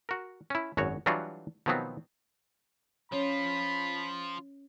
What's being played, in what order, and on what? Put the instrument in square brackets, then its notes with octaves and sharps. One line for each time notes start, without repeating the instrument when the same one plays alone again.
[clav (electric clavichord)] F#4 A#4
C#4 E4
G#1 F#2 F#4 C#5
E3 F#3 G3 D4 F4 F#4
B2 D#3 F3 F#3 B3 C4
[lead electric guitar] F3 F4 [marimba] C#4 C#5 [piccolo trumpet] B5